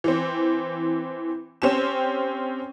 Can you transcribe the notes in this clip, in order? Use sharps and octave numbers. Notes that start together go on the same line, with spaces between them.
E3 C4
C4 C#4 G4 E7